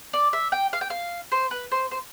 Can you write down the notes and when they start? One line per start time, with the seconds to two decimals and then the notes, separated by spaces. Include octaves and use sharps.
0.13 D5
0.33 E5
0.52 G5
0.73 F5
0.81 G5
0.90 F5
1.32 C5
1.51 B4
1.72 C5
1.91 C5